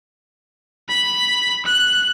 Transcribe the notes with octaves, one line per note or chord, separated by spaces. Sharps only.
B5
F#6